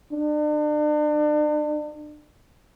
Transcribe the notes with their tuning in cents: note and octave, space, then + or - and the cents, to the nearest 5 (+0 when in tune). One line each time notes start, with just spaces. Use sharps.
D4 +40